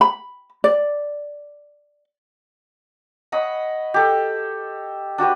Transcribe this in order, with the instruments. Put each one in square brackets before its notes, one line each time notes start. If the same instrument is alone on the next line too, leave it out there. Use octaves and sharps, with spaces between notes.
[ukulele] B5
D5
[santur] C#5 D#5 F#5 B5
G4 A4
D4 F#4 G4 B4